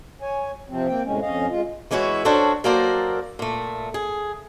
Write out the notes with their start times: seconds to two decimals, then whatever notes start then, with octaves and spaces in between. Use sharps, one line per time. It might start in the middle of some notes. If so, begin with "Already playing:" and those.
0.22 C#5 G#5
0.69 C3 F3 C4
0.88 A#3 C4 G5
1.05 A2 C3 G#3 C#4
1.22 F2 C#4 D#5 F5
1.50 G#3 F4
1.91 E3 G#3 C#4 E4 F#4
2.25 C#4 D4 F#4 A4 C5 C#5
2.64 F#3 A#3 A4 A#4 C5 D5
3.39 A#2 A3
3.94 G#4